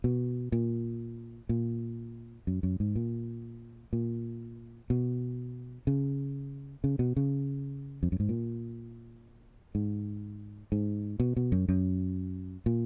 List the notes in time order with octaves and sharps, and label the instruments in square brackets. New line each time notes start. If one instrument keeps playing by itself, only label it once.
[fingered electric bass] B2
A#2
A#2
F#2
F#2
G#2
A#2
A#2
B2
C#3
C#3
B2
C#3
F2
F#2
G#2
A#2
G#2
G#2
B2
B2
F#2
F#2
A#2